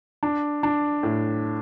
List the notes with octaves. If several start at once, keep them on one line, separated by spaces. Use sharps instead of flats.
D4
D4
A2